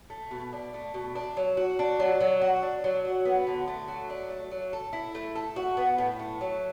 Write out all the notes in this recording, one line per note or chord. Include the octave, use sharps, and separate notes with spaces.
A3
B2
D4
A3
B2
D4
F#3
F#4
D4
F#3
F#3
F#4
D4
F#3
F#4
B3
D3
A3
F#3
D4
A3
F#3
A4
E4
A3
A4
F#4
B3
A2
A3
F#3